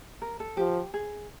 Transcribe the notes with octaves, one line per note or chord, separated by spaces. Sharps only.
A#4
A4
F3 G4
G#4